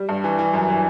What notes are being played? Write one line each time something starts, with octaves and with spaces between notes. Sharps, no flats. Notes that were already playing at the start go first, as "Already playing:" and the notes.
Already playing: G3
G2
E3
E3
F#2
E3